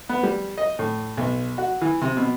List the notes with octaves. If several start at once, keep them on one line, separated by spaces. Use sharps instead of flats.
B3
G3
D#5
A2
B1
F#4
E3
C3
B2